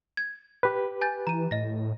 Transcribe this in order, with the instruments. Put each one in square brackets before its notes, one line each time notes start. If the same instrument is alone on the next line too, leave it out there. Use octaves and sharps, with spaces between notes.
[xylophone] G#6
[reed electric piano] G4 B4
[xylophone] G#5 G6 A6
[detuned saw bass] E3 [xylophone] A#5 D#7
[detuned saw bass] A2 [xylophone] D#5 A#6